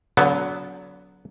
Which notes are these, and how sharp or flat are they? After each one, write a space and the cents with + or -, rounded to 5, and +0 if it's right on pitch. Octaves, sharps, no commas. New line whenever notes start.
D3 -40 F#3 +0 B3 +0